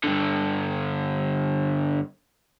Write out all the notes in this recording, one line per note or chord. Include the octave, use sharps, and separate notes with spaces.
G2 D3